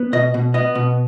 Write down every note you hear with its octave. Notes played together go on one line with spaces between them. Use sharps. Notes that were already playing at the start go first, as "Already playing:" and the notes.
Already playing: B3
B2 D#5
B2
B3 D#5
B2